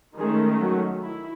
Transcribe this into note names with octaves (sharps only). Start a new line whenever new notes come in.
D#3 G#3 A3 C#4 G#4
F#3 F#4
E4